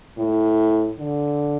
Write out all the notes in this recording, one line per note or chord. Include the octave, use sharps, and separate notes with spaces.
A2
D3